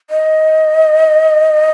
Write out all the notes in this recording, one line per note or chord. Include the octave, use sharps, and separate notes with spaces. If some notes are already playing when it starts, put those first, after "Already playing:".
D#5